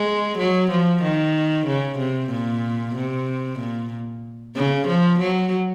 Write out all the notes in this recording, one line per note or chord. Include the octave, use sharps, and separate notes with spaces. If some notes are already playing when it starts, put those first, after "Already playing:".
Already playing: G#3
F#3
F3
D#3
C#3
C3
A#2
C3
A#2
C#3
F3
F#3